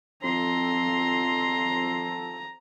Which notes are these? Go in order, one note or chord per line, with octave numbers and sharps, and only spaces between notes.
F2 F3 C4 A4 A#5 C6